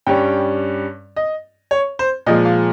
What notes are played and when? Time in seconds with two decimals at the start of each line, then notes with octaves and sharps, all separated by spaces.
0.07 G2 G3 C#4 G5
1.16 D#5
1.71 C#5
1.99 C5
2.26 A#2 F3 G#3 D#5
2.45 F5